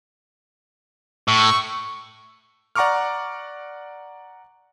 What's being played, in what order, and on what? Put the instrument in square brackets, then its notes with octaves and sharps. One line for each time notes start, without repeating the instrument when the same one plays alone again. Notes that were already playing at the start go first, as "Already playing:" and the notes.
[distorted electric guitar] A2 [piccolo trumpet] C#6
[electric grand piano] D5 F#5 A#5 C#6 D6 F6